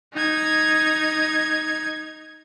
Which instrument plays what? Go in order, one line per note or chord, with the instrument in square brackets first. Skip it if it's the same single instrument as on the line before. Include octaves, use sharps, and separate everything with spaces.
[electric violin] D#4 G#6